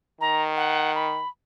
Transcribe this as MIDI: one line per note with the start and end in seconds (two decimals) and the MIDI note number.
0.21 1.19 51
0.21 0.43 82
0.56 0.95 78
0.95 1.28 83